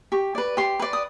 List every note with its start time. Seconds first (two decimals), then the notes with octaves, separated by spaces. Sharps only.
0.12 G4 C#6
0.35 B4 D5
0.57 G4 C6
0.80 B4 D5
0.93 D#6